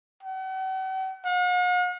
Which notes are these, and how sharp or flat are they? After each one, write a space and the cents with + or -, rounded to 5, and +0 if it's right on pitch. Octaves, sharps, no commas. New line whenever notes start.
F#5 +45
F#5 -45